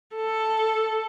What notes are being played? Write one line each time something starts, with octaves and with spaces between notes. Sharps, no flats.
A4